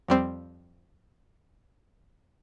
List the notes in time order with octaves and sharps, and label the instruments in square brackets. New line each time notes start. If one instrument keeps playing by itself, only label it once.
[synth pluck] F2 G3 C4